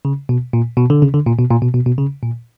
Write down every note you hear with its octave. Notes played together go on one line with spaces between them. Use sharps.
C#3
B2
A#2
B2
D3
C#3
D3
A#2
B2
A#2
B2
B2
B2
C#3
A#2